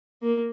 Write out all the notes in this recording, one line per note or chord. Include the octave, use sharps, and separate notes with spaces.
A#3